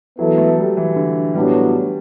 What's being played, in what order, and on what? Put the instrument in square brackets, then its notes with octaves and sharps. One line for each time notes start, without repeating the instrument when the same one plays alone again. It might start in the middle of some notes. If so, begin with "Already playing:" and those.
[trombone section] E3 B3 E4 A4 [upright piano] F#3
[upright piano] A3
G3
E3
D3
[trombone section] A2 F#3 B3 D4 [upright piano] G3